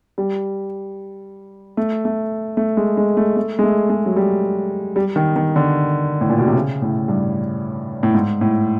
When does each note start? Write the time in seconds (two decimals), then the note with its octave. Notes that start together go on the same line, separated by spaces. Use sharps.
0.18 G3
1.77 A3
2.05 A3
2.57 A3
2.77 G#3
2.97 G#3
3.17 A3
3.37 A3
3.59 G#3
3.63 A3
3.90 G#3
4.06 F#3
4.16 G3
4.96 G3
5.16 D#3
5.36 D#3
5.56 D3
6.21 A2
6.30 A#2
6.38 B2
6.47 C3
6.55 C#3
6.82 A2
7.08 G2
8.03 A2
8.15 G#2
8.41 A2